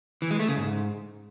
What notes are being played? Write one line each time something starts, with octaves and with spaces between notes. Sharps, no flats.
E3
G#3
A3
C#3
G#2